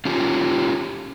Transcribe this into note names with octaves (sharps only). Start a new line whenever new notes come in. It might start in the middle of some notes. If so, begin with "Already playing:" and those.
C#4 F4 G4